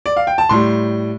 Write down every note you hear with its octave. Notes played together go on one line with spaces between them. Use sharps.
D5
F5
G5
A5
A2 G3 C6